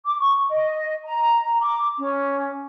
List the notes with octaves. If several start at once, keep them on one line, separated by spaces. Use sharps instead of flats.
D6
C#6
D#5
A#5
D6
C#4